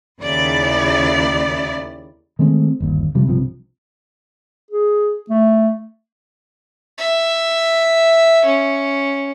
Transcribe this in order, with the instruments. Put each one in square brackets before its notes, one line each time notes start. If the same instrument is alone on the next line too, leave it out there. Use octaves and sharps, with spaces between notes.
[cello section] D#2 C#3 E4 D5
[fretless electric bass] D#3 G#3 A3 C4
G1 D#2
C3 F3 G3
B1 G2 C3 F3
[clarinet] G#4
A3
[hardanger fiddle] E5
C#4